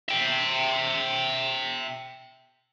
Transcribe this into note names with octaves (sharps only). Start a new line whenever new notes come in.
E5 G5